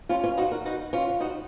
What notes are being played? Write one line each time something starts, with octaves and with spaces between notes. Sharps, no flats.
C#4 F4
C#4 F4
D#4 F#4
F#4 A#4
D#4 F#4
C#4 F4
D#4 F#4